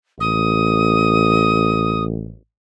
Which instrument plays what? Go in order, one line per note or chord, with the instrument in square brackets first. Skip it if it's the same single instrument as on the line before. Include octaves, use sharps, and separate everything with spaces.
[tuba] A1 [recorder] D#6